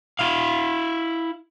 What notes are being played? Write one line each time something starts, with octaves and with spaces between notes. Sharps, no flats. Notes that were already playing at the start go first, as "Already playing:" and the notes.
E4 F5